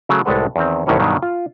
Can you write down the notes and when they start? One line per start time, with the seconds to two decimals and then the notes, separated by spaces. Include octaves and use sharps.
0.09 C#3 F#3 A3
0.25 C2 A2 G#3 A4 B4 F#5
0.56 E2 D#3 C4
0.86 C2 A2 D#3 E3 C#4 C#5
0.99 G2 B2 D#3 F#3 G3
1.22 F4